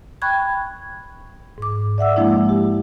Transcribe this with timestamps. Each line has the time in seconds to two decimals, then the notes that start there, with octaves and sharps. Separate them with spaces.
0.22 G5 B5 C#6 F#6 G#6
1.58 G#2 D6
1.98 D5 E5 F#5 E6
2.16 F3 G#3 A#3 D4 E4
2.49 G4